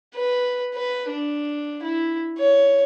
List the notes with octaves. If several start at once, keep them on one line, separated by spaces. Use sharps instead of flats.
B4
B4
D4
E4
C#5